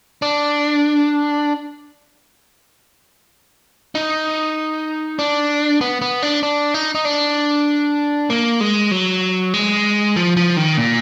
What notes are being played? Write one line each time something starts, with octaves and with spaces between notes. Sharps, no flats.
D4
D#4
D4
B3
B3
D4
D4
D#4
D#4
D4
A#3
G#3
F#3
G#3
F3
F3
D#3
A#2